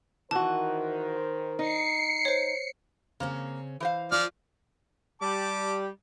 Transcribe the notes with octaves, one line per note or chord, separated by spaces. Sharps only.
D#3 E3 F#4 A#4 C5 A5
D#4 C7 C#7
C5 C#5
C#3 A#3 C4 C#4
E3 C5 F5
F3 F4 D5 F6
G3 G4 A5 D6